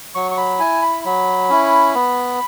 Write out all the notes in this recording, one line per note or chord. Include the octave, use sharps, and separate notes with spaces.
F#3 C#6
C#6
B5
E4 G#5
B5
F#3 B5
C#4 E4
B3